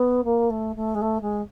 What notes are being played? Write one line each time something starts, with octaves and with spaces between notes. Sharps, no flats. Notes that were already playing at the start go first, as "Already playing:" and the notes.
Already playing: B3
A#3
A3
A3
G#3
A3
G#3